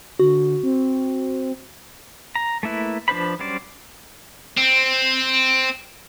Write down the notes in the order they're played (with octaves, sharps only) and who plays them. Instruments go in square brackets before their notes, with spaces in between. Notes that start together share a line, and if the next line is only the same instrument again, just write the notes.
[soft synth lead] D3 [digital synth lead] F#4
[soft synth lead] C4
[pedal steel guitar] A#5
A3 A#3 E4 B4
F3 D4 B4 C5 B5
F#3 G3 C#4 C5 D5
[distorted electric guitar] C4